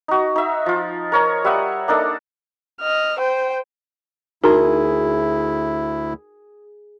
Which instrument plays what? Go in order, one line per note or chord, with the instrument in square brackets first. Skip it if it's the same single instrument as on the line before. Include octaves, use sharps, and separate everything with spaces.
[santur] D#4 F#4
D#4 E5
F3 F4
A#4 C#5 A#5
G3 E5 F#5 D#6
A#3 D4 D#4 A4
[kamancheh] D#5 F6
C5 G5
[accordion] D2 E4 [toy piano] D#4 F#4 A#5 [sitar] G#4 [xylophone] A#4